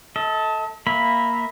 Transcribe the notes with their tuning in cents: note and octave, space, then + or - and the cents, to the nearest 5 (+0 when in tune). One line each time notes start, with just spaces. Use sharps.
A4 +0 D#5 +45
A#3 +0 E5 -10 B5 +0